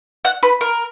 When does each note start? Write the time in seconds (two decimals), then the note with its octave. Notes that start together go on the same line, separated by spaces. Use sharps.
0.25 F#5
0.43 B4
0.61 A#4